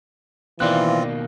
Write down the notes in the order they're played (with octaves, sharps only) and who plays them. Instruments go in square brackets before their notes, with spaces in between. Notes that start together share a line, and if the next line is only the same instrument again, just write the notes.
[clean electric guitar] B2 D#3 A#3 [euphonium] E3 [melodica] C4 F4 [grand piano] D5 F#6